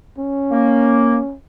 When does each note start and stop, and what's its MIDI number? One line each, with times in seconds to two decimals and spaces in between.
0.18 1.35 61
0.51 1.18 58